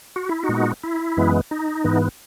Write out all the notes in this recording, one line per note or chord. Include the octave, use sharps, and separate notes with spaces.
F#4
E4
D#4 F#4
A#2 G#3 B3
E4
F#2 E3 G#3 B3
D#4
G#2 E3 B3